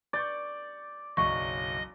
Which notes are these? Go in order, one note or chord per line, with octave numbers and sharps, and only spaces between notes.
D5 C#6 G6 A6
F#1 B1 D#5 C#6